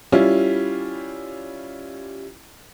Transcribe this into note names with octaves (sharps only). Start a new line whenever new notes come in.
G3 C#4 E4 F4